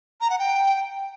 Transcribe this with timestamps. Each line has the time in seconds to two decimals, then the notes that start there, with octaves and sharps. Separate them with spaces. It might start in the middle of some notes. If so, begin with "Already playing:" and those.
0.21 A#5
0.30 F#5
0.39 G5